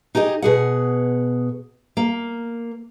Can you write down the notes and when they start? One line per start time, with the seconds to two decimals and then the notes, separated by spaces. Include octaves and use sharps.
0.15 D#4 G4 G#4 D#5
0.42 B2 G#4 F#5
1.97 A#3